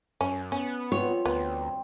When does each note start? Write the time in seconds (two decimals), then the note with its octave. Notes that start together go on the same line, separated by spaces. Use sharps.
0.21 F#2 C#4
0.52 B3 C#4
0.92 F3 G3 C4 C#5
1.25 D2 B3